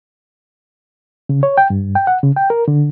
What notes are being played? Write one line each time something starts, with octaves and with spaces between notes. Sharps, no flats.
C#3
C#5
G5
G2
G5
F#5
C#3
G5
A#4
D3